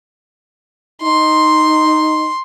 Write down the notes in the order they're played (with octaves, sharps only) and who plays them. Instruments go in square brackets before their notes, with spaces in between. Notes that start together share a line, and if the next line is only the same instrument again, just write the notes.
[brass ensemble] D#4 [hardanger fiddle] C6